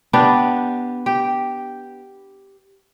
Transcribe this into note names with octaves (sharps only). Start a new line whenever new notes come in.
B3 D4 G4
G4